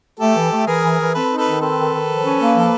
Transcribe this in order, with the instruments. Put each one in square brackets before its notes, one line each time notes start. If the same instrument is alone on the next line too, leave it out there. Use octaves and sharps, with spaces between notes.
[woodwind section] A3 [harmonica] G4 A4
[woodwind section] E3
A3
[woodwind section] E3 [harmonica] G#4 A#4
[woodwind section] E3
E3
[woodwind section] C4 [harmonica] A4 B4
[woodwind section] D#4
[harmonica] A4 B4
[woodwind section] D#3
[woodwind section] C4 [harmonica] A4 B4
[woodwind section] D#3
D#3
F3
C#4
A#3
F3